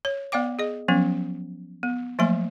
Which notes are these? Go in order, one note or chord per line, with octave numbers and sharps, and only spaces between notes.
C#5
B3 D5 F5 G5 D6
G#4 D#5
F3 F#3 B3 C#4
B3
F3 F#3 A3 A#3 G#5 C6